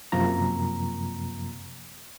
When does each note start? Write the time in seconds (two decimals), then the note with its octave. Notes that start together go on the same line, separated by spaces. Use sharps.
0.12 F#2 C3 F3 A#3 A#5